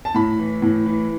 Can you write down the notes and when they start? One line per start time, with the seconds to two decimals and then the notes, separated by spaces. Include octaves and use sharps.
0.05 A5
0.15 A2 B5
0.39 E3
0.62 A2
0.86 E3